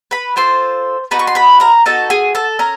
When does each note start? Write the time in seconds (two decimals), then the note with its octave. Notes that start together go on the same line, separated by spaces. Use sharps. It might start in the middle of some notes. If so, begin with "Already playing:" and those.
0.11 B4 B5
0.36 C4 F4 A4 C5 C6
1.11 B3 D#4 F#4 B4 B5
1.19 C#6
1.27 C6
1.35 B4 B5
1.60 A#4 A#5
1.86 B3 D#4 F#4 A4 A5
2.10 G#4 G#5
2.35 A4 A5
2.59 C#4 A#4 A#5